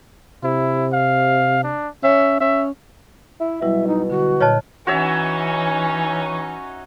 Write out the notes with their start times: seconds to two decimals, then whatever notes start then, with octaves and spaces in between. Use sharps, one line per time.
0.43 C3 E4
0.93 F5
1.63 D4
2.03 C#4 E5
2.41 C#4 E5
3.40 E4 E5
3.62 B2 F#3 G3 E4
3.87 D#4
4.10 D3 F#4
4.41 A#2 C#5 D#5 A5 F6 F#6
4.87 E3 C#4 D#4 F#4 C#5 E5